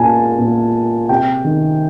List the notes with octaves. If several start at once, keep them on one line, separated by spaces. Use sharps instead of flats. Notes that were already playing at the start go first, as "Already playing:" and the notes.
Already playing: A#2 G#5 A5
A#2
C3 G5
D#3